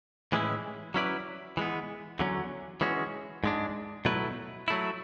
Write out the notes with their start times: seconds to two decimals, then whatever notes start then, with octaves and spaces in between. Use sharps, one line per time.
0.32 A2 E3 G#3 C#4 E4
0.94 F#3 C#4 E4 B4 D5
1.57 E3 G#3 B3
2.19 E2 D3 F#3 C#4
2.81 E3 G#3 C#4 F#4
3.44 G#2 G#3 D4
4.05 B2 F#3 A3 E4 B4
4.68 F#3 A3 E4